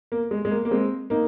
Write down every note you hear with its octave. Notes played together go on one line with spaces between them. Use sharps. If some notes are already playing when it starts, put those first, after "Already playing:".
A#3
G#3
G#3
A#3
A#3
G#3 C4
A#3 D#4